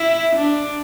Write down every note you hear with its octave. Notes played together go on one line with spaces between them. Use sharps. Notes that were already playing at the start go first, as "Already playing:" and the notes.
Already playing: E4
D4